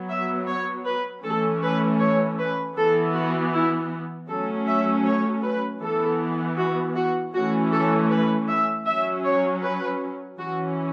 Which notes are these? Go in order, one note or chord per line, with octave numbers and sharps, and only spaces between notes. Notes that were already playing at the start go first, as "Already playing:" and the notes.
Already playing: F#3 B3
E5
C#5
B4
E3 A3 C#4 A4
B4
C#5
B4
E3 B3 A4
F#4
E4
F#3 A3 C#4 A4
E5
C#5
B4
E3 B3 A4
F#4
F#4
E3 A3 C#4 F#4
A4
B4
E5
F#3 C#4 E5
C#5
B4
E3 C#4 F#4